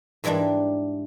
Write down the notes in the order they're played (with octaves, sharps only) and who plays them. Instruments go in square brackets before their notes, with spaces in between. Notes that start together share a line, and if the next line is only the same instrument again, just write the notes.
[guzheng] G#2 E3 G3 G#3 D4